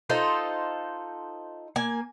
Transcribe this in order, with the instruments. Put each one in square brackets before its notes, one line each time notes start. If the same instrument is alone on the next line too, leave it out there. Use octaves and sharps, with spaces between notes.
[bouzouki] D#4 F4 A4 C5
A#3 G#5